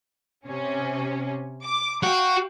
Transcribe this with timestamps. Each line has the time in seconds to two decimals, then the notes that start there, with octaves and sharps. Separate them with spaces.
0.47 C3 C#4
1.64 D6
2.03 F#4 F5 G5